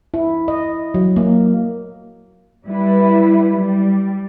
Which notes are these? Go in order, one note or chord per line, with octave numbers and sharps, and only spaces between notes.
E4
D#5
F#3
A#3
G3 E4 B4
G3